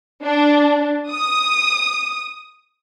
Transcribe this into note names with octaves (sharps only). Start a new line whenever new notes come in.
D4
D#6